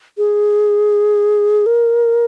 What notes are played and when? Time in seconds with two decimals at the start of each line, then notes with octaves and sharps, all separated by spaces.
0.17 G#4
1.66 A#4